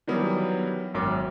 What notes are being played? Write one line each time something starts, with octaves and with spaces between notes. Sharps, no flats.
D#3 E3 F#3 G3 B3
G#1 F#2 D6